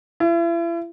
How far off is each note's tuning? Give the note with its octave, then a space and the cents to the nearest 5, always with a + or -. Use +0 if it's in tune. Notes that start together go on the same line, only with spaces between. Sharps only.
E4 +40